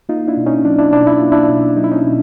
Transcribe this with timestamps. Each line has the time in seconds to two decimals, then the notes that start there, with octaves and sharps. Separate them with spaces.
0.09 A#3 D#4 F4
0.28 D4 E4
0.37 B2
0.46 C#4 D#4
0.65 F#3 D4
0.78 D4 E4
0.93 B2 D4 E4
1.07 E4
1.20 A#3 F4
1.32 D4 E4
1.49 B2
1.76 F#3 D#4
1.84 E4
1.92 C#4 D#4
2.05 B2